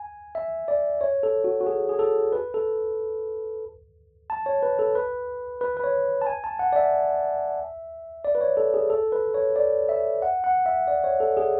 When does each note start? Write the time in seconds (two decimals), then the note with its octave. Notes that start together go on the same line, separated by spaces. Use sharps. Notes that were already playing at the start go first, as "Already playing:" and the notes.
Already playing: G#5
0.35 E5
0.68 D5
1.01 C#5
1.23 A4
1.44 F#4
1.61 F#4
1.67 G#4
1.89 G#4
1.99 A4
2.33 B4
2.54 A4
4.30 A5
4.46 C#5
4.63 B4
4.79 A4
4.95 B4
5.61 B4
5.77 B4
5.84 C#5
6.22 A5
6.27 G#5
6.44 A5
6.59 F#5
6.73 D5
6.76 E5
8.25 D5
8.35 B4
8.41 C#5
8.57 A4
8.74 G#4
8.90 A4
9.12 B4
9.34 C#5
9.56 D5
9.89 E5
10.22 F#5
10.44 F#5
10.66 E5
10.88 D5
11.04 C#5
11.20 A4
11.37 G#4